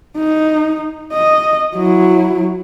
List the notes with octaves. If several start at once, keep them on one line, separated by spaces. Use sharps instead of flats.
D#4
D#5
F#3 E4